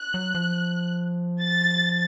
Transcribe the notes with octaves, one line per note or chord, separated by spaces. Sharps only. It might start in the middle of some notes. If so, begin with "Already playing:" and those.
Already playing: F#6
F#3
F3
A6